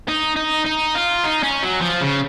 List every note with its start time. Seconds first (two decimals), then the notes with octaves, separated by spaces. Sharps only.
0.08 D#4
0.36 D#4
0.66 D#4
0.95 F4
1.24 D#4
1.43 C#4
1.63 F#3
1.81 F3
2.01 C#3